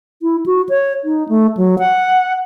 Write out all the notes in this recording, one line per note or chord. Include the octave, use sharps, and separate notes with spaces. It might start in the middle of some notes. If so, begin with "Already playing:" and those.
E4
F#4
C#5
D#4
A3
F#3
F#5